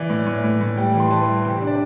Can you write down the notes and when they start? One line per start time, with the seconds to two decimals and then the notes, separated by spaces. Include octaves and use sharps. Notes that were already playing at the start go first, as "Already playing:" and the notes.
Already playing: E3 D5
0.09 A2
0.27 A2
0.44 A2
0.60 A2
0.77 G3 G5
0.94 E3
1.00 C6
1.11 E3 A5
1.28 G3
1.44 C3 G5
1.56 G5
1.61 D4
1.67 D5